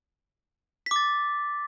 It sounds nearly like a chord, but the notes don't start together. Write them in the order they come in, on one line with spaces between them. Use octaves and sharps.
B6 D6 A6